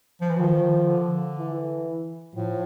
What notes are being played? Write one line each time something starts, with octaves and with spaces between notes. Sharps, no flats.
F3
E3
D#3 F3
D#3
D3
E3
A2 F3